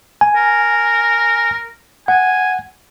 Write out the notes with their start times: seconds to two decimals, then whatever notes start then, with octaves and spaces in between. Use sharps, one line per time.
0.21 G#5
0.36 A#4
2.08 F#5 G#5